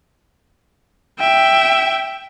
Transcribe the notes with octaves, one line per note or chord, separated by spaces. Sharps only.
E5 G5